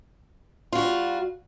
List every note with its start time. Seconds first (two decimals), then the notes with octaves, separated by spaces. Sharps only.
0.73 F4
0.75 F#4
0.78 G3